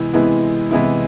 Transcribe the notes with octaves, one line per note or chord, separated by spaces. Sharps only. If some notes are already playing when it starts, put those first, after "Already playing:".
Already playing: C3 E3 G#3 B3 E4
C3 E3 G#3 B3 E4
C3 E3 G#3 B3 E4